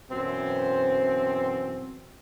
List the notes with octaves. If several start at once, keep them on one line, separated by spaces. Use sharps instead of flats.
F#2 B2 E3 C4